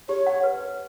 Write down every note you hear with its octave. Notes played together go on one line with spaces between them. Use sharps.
G4 C#5
F#5
B4
B4